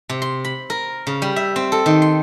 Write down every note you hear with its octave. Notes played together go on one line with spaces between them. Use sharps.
C3
C6
B5
A#4
C#3
G3
E5
C4
A4
D#3
C6